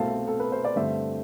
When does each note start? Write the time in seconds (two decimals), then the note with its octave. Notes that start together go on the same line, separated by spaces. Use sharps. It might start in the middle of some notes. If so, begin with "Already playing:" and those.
Already playing: C2 B2 A3 C4 F5 A5
0.28 A4
0.40 B4
0.52 C5
0.65 D5
0.76 G2 D3 A3 C4 C5 E5